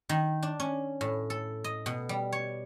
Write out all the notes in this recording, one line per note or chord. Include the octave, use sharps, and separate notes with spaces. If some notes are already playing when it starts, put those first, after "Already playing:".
D#3
D4
C#4
A2
A4
D#5
B2
G3
C#5